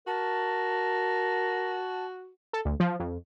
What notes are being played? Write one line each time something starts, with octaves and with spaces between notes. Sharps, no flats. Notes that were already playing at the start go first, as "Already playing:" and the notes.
F#4 A#4 A5
A4
D2
F3
F2